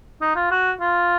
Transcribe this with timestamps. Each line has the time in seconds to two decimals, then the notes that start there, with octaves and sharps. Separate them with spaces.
0.21 D#4
0.36 F4
0.51 F#4
0.80 F4